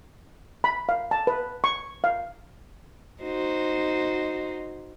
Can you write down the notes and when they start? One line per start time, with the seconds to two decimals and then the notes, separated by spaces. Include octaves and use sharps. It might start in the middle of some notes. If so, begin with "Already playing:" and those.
0.64 B5
0.89 F5
1.11 A5
1.27 B4
1.64 C#6
2.04 F5
3.22 D#4 F#4 C5